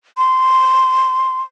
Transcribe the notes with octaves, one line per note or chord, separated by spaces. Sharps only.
C6